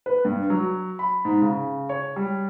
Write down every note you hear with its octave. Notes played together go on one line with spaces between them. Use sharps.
B4
G2
F#3
B5
G#2
C#3
C#5
G3